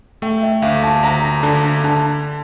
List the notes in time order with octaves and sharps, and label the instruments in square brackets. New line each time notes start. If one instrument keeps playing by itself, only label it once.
[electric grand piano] A3 [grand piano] G5
[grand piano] E5
[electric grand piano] D2 [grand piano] F5
[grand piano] A5
[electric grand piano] D2 [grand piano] A#5
[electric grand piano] D3 [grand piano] A5
[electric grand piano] D3 [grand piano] A5